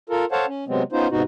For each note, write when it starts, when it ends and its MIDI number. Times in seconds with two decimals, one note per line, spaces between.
0.10 0.25 65
0.10 0.25 69
0.10 0.25 70
0.32 0.46 69
0.32 0.46 72
0.32 0.46 73
0.32 0.46 77
0.32 0.46 78
0.32 0.46 81
0.48 0.65 61
0.68 0.83 48
0.68 0.83 54
0.68 0.83 56
0.68 0.83 59
0.68 0.83 60
0.92 1.07 59
0.92 1.07 61
0.92 1.07 63
0.92 1.07 65
0.92 1.07 72
1.10 1.23 44
1.10 1.23 48
1.10 1.23 59
1.10 1.23 63
1.10 1.23 66